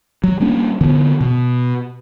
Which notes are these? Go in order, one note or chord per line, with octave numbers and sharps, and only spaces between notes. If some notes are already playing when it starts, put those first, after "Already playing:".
F#3
G3 A#3 C#4 D4
D3 E3 B3
B2